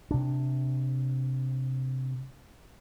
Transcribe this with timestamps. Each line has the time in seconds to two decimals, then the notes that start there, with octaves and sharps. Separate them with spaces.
0.11 C3 D4